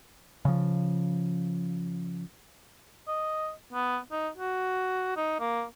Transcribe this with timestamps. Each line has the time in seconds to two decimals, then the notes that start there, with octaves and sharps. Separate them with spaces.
0.45 C#3 F3
3.07 D#5
3.73 B3
4.11 D#4
4.37 F#4
5.16 D#4
5.40 A#3